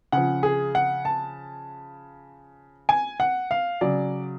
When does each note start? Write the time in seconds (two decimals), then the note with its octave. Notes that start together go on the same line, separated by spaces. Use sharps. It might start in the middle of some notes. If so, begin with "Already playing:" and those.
0.12 C#3 F3 F#5
0.43 G#4
0.75 F#5
1.05 A5
2.89 G#5
3.20 F#5
3.51 F5
3.81 C#3 F#3 D5